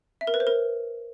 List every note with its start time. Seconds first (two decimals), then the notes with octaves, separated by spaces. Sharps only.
0.21 E5
0.27 A#4
0.34 B4
0.40 C5
0.47 A#4